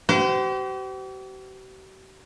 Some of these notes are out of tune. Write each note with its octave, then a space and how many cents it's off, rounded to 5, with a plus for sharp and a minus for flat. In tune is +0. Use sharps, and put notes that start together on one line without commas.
G4 -45 C5 -35